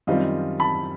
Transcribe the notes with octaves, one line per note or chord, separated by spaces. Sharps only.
F#2 D#3 G3 C4 F4 D#5 F5
A5 B5